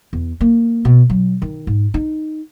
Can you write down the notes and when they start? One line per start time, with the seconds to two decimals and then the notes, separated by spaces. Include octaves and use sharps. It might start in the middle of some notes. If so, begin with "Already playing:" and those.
0.13 E2
0.41 A#3
0.85 B2
1.10 F#3
1.42 D#3
1.67 G#2
1.94 D#4